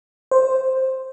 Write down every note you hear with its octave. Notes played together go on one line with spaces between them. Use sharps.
C5